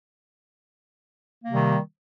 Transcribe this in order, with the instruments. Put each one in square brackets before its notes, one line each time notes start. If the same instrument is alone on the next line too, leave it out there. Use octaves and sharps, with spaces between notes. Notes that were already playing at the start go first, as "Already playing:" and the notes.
[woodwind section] A#3
C3
G3
D#3